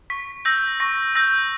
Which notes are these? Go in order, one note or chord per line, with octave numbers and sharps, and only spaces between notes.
C#6 B6
E6 G6 A#6
C#6 A#6
E6 G6 A#6